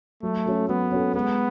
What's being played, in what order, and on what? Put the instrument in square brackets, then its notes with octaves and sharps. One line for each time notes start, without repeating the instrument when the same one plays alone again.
[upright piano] F#3 [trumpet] A3
[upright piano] C#4 F#4 A4
[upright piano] F#3 [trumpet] B3
[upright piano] C#4 F#4 A4
[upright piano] G#3 [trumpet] B3